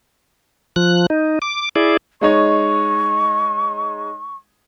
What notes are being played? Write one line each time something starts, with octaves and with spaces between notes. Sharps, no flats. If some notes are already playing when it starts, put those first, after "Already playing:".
F3 F#6
D#4
D6
E4 G#4 D5
G#3 D#4 C#5 C#6